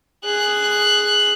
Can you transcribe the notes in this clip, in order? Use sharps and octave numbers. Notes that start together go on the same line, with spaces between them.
G#4 F#6